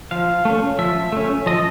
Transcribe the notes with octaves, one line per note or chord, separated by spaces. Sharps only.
F3 F5
A3 C#4
F3 E5
A3 C#4
F3 D#5